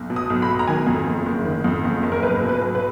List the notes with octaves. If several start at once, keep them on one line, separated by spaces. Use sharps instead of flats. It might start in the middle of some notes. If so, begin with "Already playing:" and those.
Already playing: B1
B2
D#6
B1
B5
B2
A#5
D#3 G#5
F2
F#1
F#1
D#3
F2
F#1
F#1
A#4
B1 B4
B2
B4
B1
B4